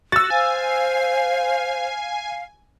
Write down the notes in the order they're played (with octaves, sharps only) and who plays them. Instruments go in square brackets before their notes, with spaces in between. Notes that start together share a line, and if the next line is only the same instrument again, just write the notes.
[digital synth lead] F#4 [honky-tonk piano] E6 A6
[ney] C5 [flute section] F5 [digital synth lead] G#5